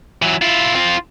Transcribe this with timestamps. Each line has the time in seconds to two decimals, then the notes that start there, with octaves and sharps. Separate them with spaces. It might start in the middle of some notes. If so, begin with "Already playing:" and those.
0.22 E3 F#3
0.42 E4 F4
0.75 C4 F4